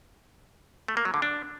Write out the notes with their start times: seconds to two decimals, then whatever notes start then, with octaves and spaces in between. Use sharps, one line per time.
0.88 A3
0.97 A#3
1.05 F#3
1.14 D3
1.22 D4